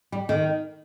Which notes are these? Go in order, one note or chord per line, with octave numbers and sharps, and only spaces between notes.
G3
D#3